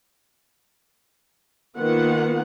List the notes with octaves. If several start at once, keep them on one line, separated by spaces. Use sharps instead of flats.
D#3 A#3 B3 F4 F#5